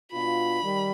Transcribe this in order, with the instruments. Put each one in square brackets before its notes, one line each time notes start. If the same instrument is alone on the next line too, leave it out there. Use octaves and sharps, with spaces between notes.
[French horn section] B2 B3 D4 F4 [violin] B5
[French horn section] D#3 G3